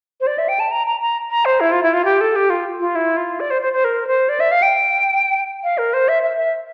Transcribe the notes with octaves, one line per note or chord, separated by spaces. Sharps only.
C5
D5
E5
G5
A5
A#5
A#5
A#5
A#5
C5
E4
F4
E4
F4
G4
A4
G4
F4
F4
E4
F4
D5
C5
C5
C5
A#4
C5
D5
E5
F5
G5
F5
A#4
C5
E5
E5
E5